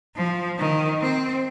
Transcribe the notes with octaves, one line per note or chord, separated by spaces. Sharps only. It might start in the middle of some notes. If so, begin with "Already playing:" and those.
F3
D#3
C4